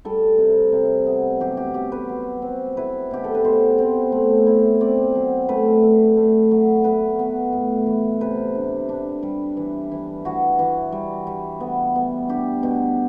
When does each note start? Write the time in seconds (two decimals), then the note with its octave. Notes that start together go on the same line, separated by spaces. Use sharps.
0.05 G3 A4
0.38 C3
0.72 C3
1.06 B3
1.40 F#3 G4
1.57 G4
1.74 F#3 G4
1.92 B4
2.09 F#3
2.42 C4
2.77 E4 B4
3.11 B2 G4
3.24 A4
3.34 B4
3.44 B2 C5
3.78 C4
4.12 A3
4.47 E4
4.81 C4 D5
5.15 F#3
5.49 A3 B4
5.83 A3
6.17 A3
6.51 F#3
6.84 B3 B4
7.19 B3
7.53 A2
7.86 E3
8.21 C3 B4
8.55 D4
8.89 D4
9.23 G3
9.57 E3
9.91 E3
10.25 E3 F#4
10.59 E3
10.92 G3
11.27 G3
11.60 B3
11.96 B3
12.29 D4 G4
12.63 B2